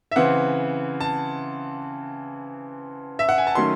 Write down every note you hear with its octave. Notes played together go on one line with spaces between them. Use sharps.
E5
C#3 E3 C4 F#5
A5
E5
F#5
G#5
A5
D#3 F#3 A3 C#4 C6